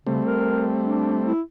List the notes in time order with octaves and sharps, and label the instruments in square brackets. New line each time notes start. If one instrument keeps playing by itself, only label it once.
[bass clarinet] C#3 [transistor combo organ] G3 A3 C4
[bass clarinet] A#4
D4
E4